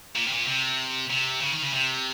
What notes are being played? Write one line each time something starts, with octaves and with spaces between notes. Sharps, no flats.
A#2
C3
A#2
C3
C3
C#3
D#3
C#3
C3